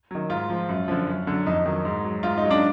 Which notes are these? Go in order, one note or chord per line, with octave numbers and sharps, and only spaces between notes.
D#3 F#3
G#2 F4
F3
F#2
D3 F3
F#2
D3 F#3
F2 D#4
D#3 F#3
G#2
F#3
G#2 F4
D#4
F#3
D4